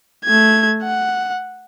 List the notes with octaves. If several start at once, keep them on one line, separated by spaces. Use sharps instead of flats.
A3 G#6
F#5